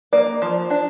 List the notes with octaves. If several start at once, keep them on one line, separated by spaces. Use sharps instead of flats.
A#3 D5
F3
D4